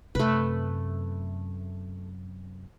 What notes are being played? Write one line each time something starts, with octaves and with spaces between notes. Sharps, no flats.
F#2 C3 A3 B4